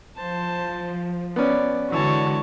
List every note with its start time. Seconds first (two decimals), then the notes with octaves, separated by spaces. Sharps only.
0.16 F3 C5 A5
1.36 B3 C#4 D5
1.92 D3 E3 G#3 F#4 C#5 A5